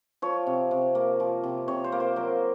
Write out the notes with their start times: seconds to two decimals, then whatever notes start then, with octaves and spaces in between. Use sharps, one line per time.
0.22 F3 C#5
0.47 C3
0.71 C3
0.95 A#3
1.20 F3
1.44 C3
1.68 C3 C#5
1.84 C5
1.92 A#3
2.00 C5
2.16 F#3 A#4